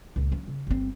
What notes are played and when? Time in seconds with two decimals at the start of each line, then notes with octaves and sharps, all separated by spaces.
0.16 C#2 A#2
0.32 F3 C#4
0.47 C#3
0.67 G1 C4